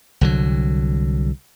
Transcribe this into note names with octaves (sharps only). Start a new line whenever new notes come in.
C2 D3 F#3